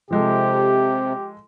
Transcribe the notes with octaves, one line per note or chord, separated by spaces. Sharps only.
C3 F3 G#3 G4 A4